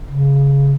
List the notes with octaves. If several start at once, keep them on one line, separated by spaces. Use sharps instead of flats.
C#3